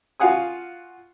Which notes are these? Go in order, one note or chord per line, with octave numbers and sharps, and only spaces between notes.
F4 F#4 F5 F#5 G#5 D#6